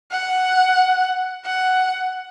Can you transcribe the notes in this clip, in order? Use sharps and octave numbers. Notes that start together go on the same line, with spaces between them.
F#5
F#5